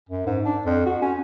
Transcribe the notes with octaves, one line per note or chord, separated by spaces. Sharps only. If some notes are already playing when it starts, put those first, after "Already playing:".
F#2
G#2
D4
F2
F#4
C#4